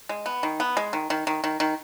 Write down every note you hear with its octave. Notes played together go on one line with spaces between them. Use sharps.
G#3
B3
D#3
B3
G#3
D#3
D#3
D#3
D#3
D#3